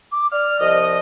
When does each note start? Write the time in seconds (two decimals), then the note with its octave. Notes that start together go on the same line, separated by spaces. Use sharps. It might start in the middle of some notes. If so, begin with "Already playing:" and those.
0.11 D6
0.32 D5 F6
0.60 C2 F3 D#5